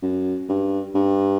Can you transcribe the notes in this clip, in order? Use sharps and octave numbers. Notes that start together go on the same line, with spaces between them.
F#2
G2
G2